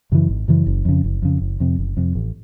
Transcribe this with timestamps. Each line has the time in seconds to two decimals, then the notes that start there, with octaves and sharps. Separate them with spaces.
0.12 F#2 C#3 E3
0.29 G#1
0.48 F#2 C#3 E3
0.67 F#1
0.85 F2 C#3
1.04 F#1
1.22 F2 C#3
1.42 F#1
1.60 F2 C3
1.79 F#1
1.97 F2 C3
2.15 A1